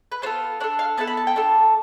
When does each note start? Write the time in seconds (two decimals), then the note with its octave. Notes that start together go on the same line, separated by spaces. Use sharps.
0.12 B4
0.22 B3 F4 A4 C5
0.60 D4 D5
0.64 A4
0.79 F5
0.97 B3 E4 A4 A5
1.07 B5
1.17 A5
1.27 G5
1.36 D4 F4 A4